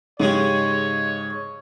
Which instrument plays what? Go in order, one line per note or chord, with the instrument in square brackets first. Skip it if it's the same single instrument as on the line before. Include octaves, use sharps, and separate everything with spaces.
[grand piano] G#2 [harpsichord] C#3 G#3 G4 [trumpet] C#5